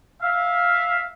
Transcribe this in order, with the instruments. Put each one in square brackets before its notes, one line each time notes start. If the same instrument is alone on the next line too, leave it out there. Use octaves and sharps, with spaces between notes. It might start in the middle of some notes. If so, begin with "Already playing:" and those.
[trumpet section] E5 F5